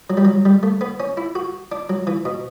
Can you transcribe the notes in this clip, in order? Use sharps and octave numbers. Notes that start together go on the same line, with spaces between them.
F#3
G3
F#3
G3
A3
B3
C#4
E4
F#4
D4
F#3
E3
B2